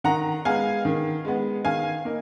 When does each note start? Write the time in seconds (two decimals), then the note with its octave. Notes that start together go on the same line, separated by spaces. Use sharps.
0.04 D#3 F#5 A#5
0.45 G#3 B3 F5 G#5
0.85 D#3
1.25 G#3 B3
1.65 D#3 F5 G#5
2.05 A#3 D#4